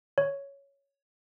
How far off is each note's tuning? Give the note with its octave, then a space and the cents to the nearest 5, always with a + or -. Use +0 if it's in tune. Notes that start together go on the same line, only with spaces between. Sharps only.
C#5 +5